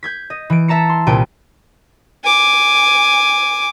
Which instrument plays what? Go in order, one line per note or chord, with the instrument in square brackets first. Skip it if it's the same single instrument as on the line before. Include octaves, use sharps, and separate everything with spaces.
[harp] G6 G#6 B6
D#5
E3 D7
E5 A5 A#5 C#7
C6
C2 A#2 G5 D#7
[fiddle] G#5 D6